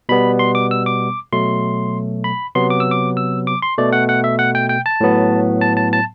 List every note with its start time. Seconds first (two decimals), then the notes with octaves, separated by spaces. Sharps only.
0.09 B2 G3 B3 B5
0.39 C6
0.55 D6
0.71 E6
0.86 D6
1.32 B2 F#3 A3 C6
2.24 B5
2.55 C3 F#3 B3 C6
2.70 D6
2.80 E6
2.91 D6
3.17 E6
3.47 D6
3.62 C6
3.78 B2 A3 D5
3.93 F#5
4.09 F#5
4.24 E5
4.39 F#5
4.55 G5
4.69 G5
4.86 A5
5.01 A2 F#3 B3
5.61 A5
5.77 A5
5.93 A5